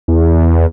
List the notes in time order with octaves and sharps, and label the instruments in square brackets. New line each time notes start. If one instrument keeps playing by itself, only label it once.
[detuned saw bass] E2